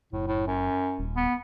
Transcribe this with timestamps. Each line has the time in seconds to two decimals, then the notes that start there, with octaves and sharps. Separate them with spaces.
0.13 F#1 A2
0.27 A2
0.47 F#2
0.99 D#1
1.16 B3